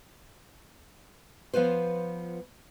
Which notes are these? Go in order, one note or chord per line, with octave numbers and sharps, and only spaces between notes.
F3 B3 F4 B4 C5